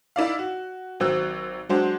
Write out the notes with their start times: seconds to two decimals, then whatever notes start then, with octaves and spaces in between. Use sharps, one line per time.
0.16 D#4 E4 D5 F5
0.39 F#4
1.00 G#1 F#3 C4 E6 F#6
1.69 F#3 G#3 D4 C5 F#5